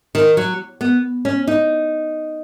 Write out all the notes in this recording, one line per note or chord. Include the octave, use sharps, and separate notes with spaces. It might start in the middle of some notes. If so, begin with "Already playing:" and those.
D#3
F#3
B3
C#4
D#4